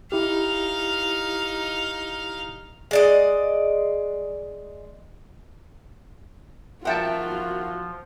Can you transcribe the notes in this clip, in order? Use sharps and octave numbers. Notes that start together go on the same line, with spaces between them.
D#4 E4 G4 F5
G#3 D5 D#5
F3 F4 F#4 A#4 E5 F#5 G5 A5